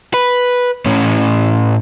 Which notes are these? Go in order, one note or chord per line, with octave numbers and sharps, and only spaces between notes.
B4
A2 C#4